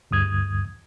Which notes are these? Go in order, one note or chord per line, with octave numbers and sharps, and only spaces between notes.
D2 G2 D#6 G#6